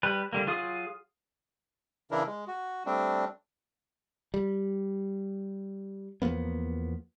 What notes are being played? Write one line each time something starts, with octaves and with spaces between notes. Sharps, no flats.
G3 B4
D3 G3 A#3
F#3 F4 G#4 F5 D#6
C#3 E3 D4 E4 A#4
G#3
F#4
G3 A3 C4 D4
G3
E2 F3 A#3 B3